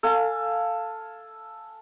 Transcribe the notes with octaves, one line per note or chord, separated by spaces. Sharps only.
A4 F5 G#5